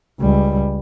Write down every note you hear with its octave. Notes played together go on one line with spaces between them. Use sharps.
C#2 G3